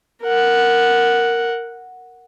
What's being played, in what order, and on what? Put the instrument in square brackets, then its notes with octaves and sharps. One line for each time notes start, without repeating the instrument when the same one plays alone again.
[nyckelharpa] A#4 F#5